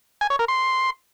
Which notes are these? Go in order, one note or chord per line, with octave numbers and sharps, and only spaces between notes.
G#5
C#5
A#4
C6